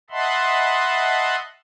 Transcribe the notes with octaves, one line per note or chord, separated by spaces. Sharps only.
D#5 E5 F#5 A5 B5 C6